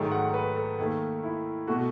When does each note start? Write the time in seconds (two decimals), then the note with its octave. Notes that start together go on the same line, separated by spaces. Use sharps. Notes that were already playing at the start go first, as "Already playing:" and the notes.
Already playing: G#2 D#3 F#3 A3
0.12 F#5
0.34 B4
0.56 A4
0.79 D#2 D#3 A3
1.23 E4
1.67 B2 A3 F#4